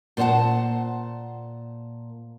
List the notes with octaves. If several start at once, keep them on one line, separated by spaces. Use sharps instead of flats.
A#2 C5 C#5 F#5 A5